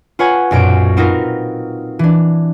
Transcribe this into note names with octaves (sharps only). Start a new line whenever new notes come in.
F4 B4 C#5 F#5 G#5
B1 F#2 A#2 D7
C4 D#4 F4 F#4 A#4 B4
E3 D4